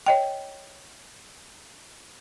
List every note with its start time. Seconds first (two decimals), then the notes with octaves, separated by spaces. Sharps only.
0.06 C#5 D#5 G5